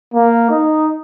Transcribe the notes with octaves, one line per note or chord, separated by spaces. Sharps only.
A#3
D#4